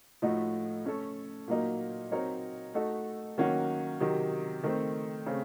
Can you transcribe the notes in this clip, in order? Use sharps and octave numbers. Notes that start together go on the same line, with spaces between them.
A2 F3 A3 D#4 F#4
A3 C#4 A4
A#2 F#3 A#3 D#4 A#4
F#3 C4 D#4 A#4 C#5
A3 D#4 F#4 A4
D#3 F#3 A#3 C#4 F#4
C3 D#3 F#3
D#3 A3 C4
C#3 A3 C4